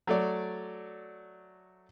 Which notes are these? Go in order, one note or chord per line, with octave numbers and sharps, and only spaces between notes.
F#3 A3 D5